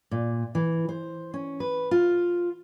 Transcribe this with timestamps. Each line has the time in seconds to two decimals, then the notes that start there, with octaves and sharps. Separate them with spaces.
0.11 A#2
0.55 E3
0.89 C5
1.34 C#4
1.60 B4
1.91 F4